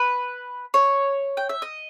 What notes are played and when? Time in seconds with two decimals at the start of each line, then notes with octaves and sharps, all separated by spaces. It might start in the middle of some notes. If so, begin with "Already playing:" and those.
Already playing: B4
0.74 C#5
1.37 G5
1.49 E5
1.62 D#5